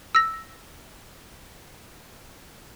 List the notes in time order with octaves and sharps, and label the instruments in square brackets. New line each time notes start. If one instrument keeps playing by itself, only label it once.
[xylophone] E6 A#6